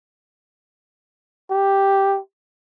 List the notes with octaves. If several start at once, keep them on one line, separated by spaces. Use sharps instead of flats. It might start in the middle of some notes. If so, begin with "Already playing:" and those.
G4